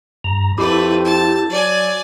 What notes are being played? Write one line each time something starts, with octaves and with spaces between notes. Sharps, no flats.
G2 A#5
F2 A3 E4 G4 B4
A5
F#3 D5 G#5